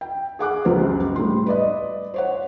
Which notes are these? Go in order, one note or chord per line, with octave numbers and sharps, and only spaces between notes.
G5
G#4 F#5 D6 F#6
C#2 F#2 G4 C5
A2 G3 C6
B4 D5 D#5
C5 C#5 F#5